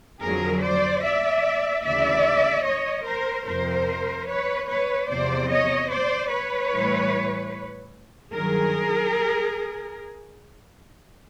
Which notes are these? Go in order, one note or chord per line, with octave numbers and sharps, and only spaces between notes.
F2 D3 F#3 G#4 A#4
C5 D5
D5 E5
D2 C#3 E3 D5 E5
C#5 D#5
A#4 C5
F2 C3 F3 A#4 C5
B4 C#5
B4 C#5
E2 C3 F3 C5 D5
C#5 D#5
C5 D5
B4 C#5
A2 E3 G3
G2 D#3 F#3 G#4 A#4